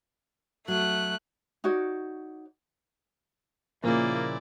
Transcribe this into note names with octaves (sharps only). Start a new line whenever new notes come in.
F#3 A3 F#6
D#4 F#4 C#5 D5
A#2 C#3 F3 A#3 E4 D5